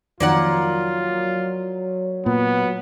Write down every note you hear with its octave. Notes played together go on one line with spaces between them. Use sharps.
F2 D#3 F#3 A#3 F4 D5 F#5
A#2 B3